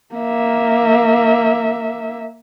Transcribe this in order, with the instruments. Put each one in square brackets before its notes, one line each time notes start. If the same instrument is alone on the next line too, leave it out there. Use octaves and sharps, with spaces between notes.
[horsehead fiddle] A#3 E5